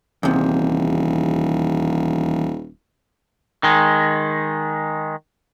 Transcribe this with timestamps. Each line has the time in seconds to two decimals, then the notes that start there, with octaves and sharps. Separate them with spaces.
0.23 D#1 E2 C3
3.63 D#3 G#3